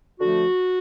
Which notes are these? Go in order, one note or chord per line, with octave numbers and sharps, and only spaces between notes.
D3 F3 A3 F#4